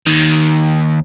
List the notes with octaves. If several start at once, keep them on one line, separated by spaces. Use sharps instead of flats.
D#2 D#3